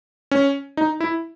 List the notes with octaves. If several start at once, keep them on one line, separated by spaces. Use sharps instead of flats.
C#4
D#4
E4